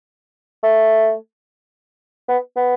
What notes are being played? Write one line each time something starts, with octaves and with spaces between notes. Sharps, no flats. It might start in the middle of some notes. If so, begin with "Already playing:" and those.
A3
B3
B3